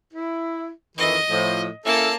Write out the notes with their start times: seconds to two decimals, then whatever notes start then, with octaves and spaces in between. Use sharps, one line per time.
0.13 E4
0.98 F2 D#3 E3 D#5
1.30 A2 F3
1.85 A#3 C#4 E4 A4 A5